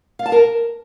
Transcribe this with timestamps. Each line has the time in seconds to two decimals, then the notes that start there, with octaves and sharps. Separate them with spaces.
0.19 F5
0.26 A5
0.32 A#4